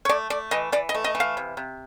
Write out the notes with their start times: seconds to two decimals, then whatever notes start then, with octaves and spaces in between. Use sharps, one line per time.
0.05 C#5
0.09 A3 D5
0.30 A3 D5
0.51 E3 D#5
0.72 E3 D5
0.89 D#5
0.94 A3
1.04 D#5
1.15 E3
1.20 F5
1.37 C3
1.57 C3